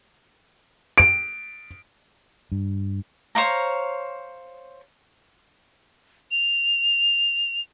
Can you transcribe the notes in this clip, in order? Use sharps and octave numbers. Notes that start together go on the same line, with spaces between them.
D7
G2
C5 C#5 F5 A#5
F7